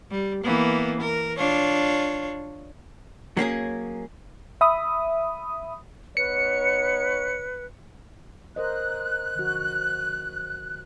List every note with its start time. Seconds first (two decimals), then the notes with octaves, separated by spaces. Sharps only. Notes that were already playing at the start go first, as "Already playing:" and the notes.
0.11 G3
0.43 E3 A#3 B3
1.00 A#4
1.38 D4 F4 C#5
3.37 F#3 A#3 C#4 G#4
4.61 E5 B5 D#6
6.17 B3 D#4 B4 C#5 C#7
8.56 A#4 C5 D#5 F#6
9.35 D3 F3 F#4